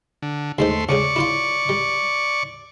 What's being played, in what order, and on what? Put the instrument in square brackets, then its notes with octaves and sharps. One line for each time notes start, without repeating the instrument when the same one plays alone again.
[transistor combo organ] D3
[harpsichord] D#2 G#3 C5 [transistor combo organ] A3 C6
[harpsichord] C#2 C#4 G#4 [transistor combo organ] D5 C#6
[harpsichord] E4 F4 C6
G3